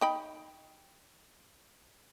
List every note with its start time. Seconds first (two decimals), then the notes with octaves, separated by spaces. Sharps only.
0.01 D#4 G5 B5